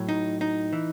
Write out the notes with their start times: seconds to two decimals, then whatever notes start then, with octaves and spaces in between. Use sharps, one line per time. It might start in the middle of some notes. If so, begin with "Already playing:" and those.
Already playing: A2 F#3
0.09 D#4
0.41 D#4
0.73 E3